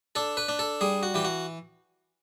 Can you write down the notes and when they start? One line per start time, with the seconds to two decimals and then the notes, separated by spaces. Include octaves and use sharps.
0.15 D4 A4
0.37 B4
0.49 D4
0.59 A4
0.81 G3 G#4
1.03 F#4
1.14 E3 G4
1.25 F#4